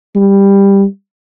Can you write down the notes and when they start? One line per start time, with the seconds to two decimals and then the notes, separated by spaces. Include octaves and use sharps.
0.15 G3